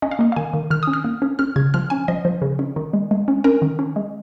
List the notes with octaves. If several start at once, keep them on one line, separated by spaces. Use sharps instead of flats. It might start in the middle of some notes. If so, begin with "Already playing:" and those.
C#4 D#5
F5
A#3 D#5
F5
D#3 G#5
D#3
D#3 F6
C#4 D#6
F6
A#3
C#4
C#4 F6
C#3 G#6
F3 F6
C#4 G#5
F3 D#5
F3
C#3
C#4
D#3
G#3
G#3
C#4
C#4 A#4
D#3
C#4
G#3